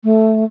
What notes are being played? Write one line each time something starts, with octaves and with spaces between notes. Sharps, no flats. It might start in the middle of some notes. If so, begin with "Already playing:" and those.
A3